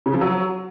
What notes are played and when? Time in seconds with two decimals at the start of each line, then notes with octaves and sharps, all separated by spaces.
0.06 C#3
0.13 F3
0.21 F#3